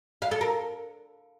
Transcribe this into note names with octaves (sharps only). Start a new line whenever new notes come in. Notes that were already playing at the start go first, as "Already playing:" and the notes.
F5
A4
A#4